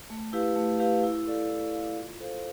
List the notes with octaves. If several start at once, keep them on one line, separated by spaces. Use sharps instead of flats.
A3
E4 G4 B4 F5
A3
E4 G4 B4 F5
E4
A4 D5 F5
E4
A4 D5 F5
F4
A4 C5 F5